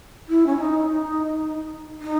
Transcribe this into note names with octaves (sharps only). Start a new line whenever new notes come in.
E4
C#4
D#4
D#4